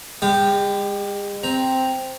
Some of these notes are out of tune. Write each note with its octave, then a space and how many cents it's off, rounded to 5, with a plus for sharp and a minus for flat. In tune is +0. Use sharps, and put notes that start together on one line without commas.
G#3 -45 G4 +0
C4 +0 A#5 +0